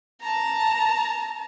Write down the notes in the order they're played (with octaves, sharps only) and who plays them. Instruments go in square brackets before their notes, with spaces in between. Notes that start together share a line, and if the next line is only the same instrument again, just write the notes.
[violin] A5 A#5